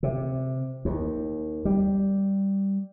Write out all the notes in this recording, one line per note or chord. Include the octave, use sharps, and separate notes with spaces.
C3
D#2
G3